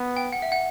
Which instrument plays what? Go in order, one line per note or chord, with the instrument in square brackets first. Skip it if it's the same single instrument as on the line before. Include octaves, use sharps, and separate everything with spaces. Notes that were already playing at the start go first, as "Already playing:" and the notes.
Already playing: [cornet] B3
[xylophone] G5
F#5
E5
F#5